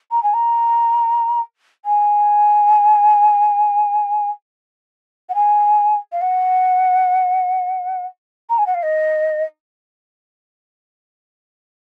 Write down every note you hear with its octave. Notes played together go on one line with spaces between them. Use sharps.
A#5
G#5
A#5
G#5
F#5
G#5
F5
F#5
A#5
G#5
F#5
F5
D#5